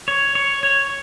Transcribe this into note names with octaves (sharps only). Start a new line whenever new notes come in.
C#5
C#5
C#5